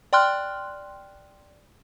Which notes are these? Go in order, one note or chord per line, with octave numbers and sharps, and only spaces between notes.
D5 G5 C6 F6 F#6